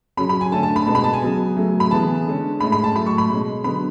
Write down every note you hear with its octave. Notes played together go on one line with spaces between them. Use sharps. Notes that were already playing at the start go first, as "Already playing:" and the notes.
C#3 F#3 C#4 B5
B5
G#5
D3 A3 C#4 A5
A5
B5
B2 G#3 B3 A5
B5
A5
G#5
C#3 F#3 B3
C#3 F#3 A3
B5
C#3 E3 B3 A5
D3 G#3 C#4
A2 G#3 C#4 B5
B5
A5
A2 F#3 A3 B5
C#6
B5
B2 G#3 C#4
D3 F#3 B3 B5